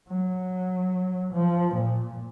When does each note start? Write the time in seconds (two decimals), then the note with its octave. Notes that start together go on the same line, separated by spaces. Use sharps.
0.09 F#3
1.34 F3
1.76 A#2